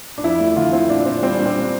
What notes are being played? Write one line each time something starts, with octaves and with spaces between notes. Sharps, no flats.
D4
F2 E4
A3
D3 F4
C4 E4
A#2 D4
C4
G3 C4
A#2 D4
C4